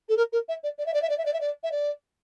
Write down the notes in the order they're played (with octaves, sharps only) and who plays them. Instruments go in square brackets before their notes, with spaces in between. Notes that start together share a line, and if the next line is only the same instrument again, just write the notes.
[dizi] A4
A#4
A#4
E5
D5
D5
E5
D5
E5
D5
E5
D5
E5
D5
E5
D5